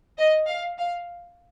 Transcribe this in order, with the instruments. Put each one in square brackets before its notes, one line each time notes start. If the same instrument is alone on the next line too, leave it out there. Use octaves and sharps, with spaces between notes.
[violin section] D#5
F5
F5